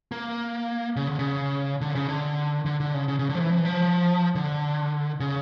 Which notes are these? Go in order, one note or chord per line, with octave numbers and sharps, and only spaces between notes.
A#3
C#3
D3
C#3
D3
C#3
D3
D3
D3
C#3
C#3
C#3
D3
F3
E3
F3
E3
F3
D3
C#3